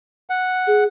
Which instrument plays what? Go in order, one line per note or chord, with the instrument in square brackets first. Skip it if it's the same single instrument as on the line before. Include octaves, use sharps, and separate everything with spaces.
[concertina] F#5
[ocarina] G#4